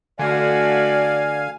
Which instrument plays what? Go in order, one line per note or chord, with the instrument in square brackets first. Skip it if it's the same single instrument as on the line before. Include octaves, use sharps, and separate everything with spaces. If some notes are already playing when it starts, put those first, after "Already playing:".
[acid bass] D3 [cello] A3 F#4 [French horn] D5 [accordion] F5 G#5